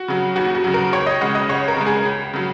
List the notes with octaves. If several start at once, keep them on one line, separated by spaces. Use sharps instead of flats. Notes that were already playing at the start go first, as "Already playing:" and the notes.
Already playing: F#4
C#3 F#3
D#2 F#4
F#4
C#3 F#3
A#4
C#2 C#5
D#5
C#3 G#3 F#5
D#5
C#2 C#5
A#4
C#3 G#3
G#4
C#2
C#3 F#3